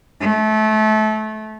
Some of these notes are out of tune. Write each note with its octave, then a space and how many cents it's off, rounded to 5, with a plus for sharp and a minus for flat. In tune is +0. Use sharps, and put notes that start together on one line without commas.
A3 -25